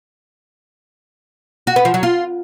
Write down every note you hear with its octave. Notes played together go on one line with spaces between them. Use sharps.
F#4
B4
F3
F#3
F4